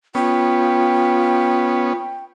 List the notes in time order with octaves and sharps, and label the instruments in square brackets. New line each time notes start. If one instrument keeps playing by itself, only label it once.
[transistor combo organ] B3 C#4 [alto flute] F4 [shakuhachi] G5